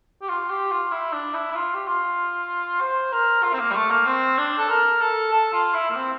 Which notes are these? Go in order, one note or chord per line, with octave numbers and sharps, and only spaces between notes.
G4
F4
G4
F4
E4
D4
E4
E4
F4
G4
F4
C5
A#4
F4
C4
A#3
G3
A3
A#3
C4
D4
A4
A#4
A4
A4
F4
E4
A#3
C4